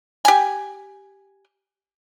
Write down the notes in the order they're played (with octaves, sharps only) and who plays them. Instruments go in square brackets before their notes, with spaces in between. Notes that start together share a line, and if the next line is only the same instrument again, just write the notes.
[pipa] G4 G#5